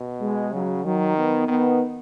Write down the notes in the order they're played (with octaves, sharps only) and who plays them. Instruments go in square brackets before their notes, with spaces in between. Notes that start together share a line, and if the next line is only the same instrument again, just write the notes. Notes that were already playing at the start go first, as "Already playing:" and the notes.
Already playing: [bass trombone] B2
[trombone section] G#3
[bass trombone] C#3 [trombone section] F#3
[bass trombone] D#3 [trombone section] F#3
[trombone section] B3
[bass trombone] D#3 [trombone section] B3